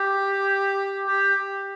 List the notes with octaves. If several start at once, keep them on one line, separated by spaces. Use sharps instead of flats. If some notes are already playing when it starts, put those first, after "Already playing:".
Already playing: G4
G4